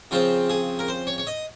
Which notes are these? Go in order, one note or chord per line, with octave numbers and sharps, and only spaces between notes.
C#3 F3 C4 F4
G#4
A#4
C5
C#5
C#5
D#5